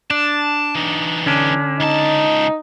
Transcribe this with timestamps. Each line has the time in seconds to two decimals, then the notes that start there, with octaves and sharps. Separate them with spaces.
0.11 D4 A5
0.75 E3 D#4
1.26 D3 C#4 D4
1.80 C#2 D#4 A5